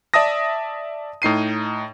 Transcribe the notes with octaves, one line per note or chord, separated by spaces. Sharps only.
D5 E5 A5 D#6 A#6
A2 D#4 C7 D#7